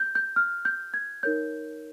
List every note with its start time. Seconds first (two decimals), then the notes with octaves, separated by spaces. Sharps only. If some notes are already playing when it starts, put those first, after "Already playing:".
Already playing: G6
0.15 G6
0.36 F6
0.65 G6
0.94 G#6
1.23 D#4 A#4 C#5 G6